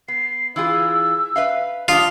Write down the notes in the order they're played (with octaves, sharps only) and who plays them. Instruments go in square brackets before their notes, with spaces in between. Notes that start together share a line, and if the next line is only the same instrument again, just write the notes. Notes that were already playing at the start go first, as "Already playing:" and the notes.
[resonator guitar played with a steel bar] B3 [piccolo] C7
[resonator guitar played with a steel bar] E3 F4 G#4 [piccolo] E6
[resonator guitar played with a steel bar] B4 E5 F5
[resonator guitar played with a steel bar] D4 G4 [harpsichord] F4 [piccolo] D#6